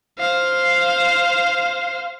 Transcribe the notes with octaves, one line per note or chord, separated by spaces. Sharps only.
C5 F5